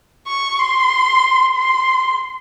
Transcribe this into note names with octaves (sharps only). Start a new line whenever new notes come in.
C#6
C6
C6